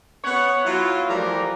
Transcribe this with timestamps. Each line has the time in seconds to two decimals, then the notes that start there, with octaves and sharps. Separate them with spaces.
0.24 B3 C#5 F#5
0.65 F#3 E4 F4
1.08 E3 F3 G3 A3 G4 A#4